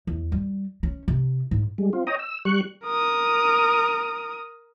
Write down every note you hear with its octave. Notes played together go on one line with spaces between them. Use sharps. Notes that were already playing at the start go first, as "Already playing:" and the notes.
E2
G3
C#4
C3
G#2
G3 G#3
C4 F4
C#5 D#5 G5 A#5 D#6
E6
G3 C#6 F#6
A#4 D#6